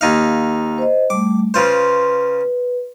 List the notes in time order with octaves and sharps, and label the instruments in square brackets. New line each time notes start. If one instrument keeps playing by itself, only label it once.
[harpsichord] D#2 D#4 F5
[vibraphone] C5 D#5
[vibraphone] G3 A3 [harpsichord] D6
[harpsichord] C#3 F4 C5 [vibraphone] B4